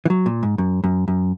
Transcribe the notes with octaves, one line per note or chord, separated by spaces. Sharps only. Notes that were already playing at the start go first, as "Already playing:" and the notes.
E3
F#3
A#2
G#2
F#2
F#2
F#2